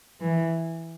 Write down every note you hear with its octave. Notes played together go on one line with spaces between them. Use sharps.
E3